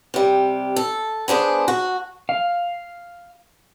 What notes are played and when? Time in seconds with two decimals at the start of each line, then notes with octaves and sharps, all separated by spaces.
0.14 C3 G3
0.76 A4
1.28 B3 D4 G#4 C5
1.68 F#4
2.29 F5